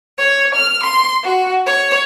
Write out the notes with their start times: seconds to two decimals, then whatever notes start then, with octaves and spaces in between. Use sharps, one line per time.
0.19 C#5
0.54 F6
0.84 C6
1.25 F#4
1.66 C#5